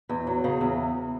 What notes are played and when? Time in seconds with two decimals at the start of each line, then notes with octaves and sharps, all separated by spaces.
0.09 E2
0.27 F#3
0.44 C#3
0.61 E2